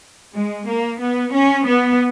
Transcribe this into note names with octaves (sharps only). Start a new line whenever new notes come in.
G#3
A#3
B3
C#4
B3